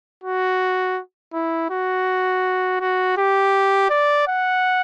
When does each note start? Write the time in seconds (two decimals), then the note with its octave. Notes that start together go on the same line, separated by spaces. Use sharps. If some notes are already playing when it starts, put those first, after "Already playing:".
0.23 F#4
1.33 E4
1.70 F#4
2.80 F#4
3.17 G4
3.90 D5
4.27 F#5